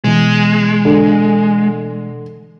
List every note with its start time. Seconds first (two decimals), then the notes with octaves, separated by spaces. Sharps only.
0.04 B2 E3 G#3
0.85 D3